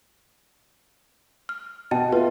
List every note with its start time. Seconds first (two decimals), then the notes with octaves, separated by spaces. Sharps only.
1.49 F6
1.91 B2 D#5 G5 A5
2.12 F4 B4 E5